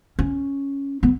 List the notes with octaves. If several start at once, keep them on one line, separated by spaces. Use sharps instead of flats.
C#4
B3